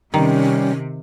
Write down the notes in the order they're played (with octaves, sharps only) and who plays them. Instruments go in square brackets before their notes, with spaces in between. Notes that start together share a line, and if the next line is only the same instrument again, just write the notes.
[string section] C3 [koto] D#3 [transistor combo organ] G3 [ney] C#4